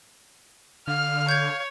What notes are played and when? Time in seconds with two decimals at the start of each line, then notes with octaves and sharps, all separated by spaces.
0.87 D3 F5 F6
1.29 C#5 G6 G#6